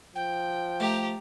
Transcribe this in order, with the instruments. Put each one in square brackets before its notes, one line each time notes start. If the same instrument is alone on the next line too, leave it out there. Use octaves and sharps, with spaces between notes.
[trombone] F3 [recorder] G5
[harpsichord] A3 [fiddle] G4 A#5